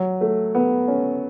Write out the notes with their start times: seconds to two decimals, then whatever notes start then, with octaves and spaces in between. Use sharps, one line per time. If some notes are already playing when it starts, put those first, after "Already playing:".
Already playing: F#3
0.21 A3
0.55 B3
0.88 C#4